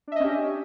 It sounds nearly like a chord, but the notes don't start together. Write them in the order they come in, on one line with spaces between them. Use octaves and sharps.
D4 E5 D#5 C#4 G4